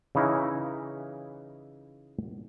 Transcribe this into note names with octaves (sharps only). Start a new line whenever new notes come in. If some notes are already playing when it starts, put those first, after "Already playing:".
C#3 E3 D#4 E4